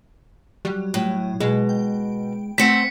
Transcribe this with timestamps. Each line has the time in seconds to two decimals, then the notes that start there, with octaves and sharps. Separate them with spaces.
0.65 F#3 G3
0.94 A2
1.40 B2 G#3
1.69 G5
2.58 A3 C4 F#5 B6 C#7